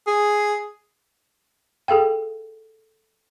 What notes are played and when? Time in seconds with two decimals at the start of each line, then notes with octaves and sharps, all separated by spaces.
0.07 G#4
1.88 G#4 A4 F5 G5